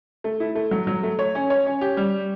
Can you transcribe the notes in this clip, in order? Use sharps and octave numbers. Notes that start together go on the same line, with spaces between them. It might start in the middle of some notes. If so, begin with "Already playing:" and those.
A3
E4
A3
F#3
F#3
A3
C#5
C#4
C#5
C#4
G4
G3